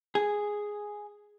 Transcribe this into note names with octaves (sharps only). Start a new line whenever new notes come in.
G#4